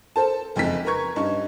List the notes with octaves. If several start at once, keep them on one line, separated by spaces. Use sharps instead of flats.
A4 A#4 C5 A5
F#1 F2 D#4 B6
A#4 B4 A#5 C#6 G#6
G2 C#4 D#4 C#6